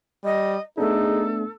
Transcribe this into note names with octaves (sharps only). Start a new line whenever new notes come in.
G3 D#5
A3 B3 D4 D#4 G#4 A4